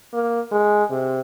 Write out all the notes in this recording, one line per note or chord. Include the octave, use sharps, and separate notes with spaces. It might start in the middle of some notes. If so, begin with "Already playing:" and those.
A#3
G#3
C3